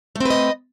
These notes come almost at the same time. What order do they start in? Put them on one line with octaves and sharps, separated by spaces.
A3 C4 B4 D#5